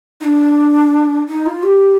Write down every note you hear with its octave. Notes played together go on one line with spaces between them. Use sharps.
D#4
D4
D#4
F4
G4